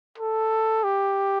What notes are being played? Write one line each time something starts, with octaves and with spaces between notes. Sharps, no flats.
A4
G4